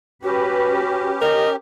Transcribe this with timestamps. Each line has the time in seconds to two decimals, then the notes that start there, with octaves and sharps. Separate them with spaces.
0.23 C#4 F#4 G4 B4
1.21 A#4 D#5